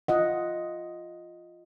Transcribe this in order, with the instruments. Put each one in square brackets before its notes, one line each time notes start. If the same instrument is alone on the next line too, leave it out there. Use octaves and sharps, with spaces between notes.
[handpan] F4 D#5 F#5